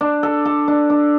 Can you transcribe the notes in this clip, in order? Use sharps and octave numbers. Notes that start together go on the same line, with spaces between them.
D4
A4
A4
D4
D4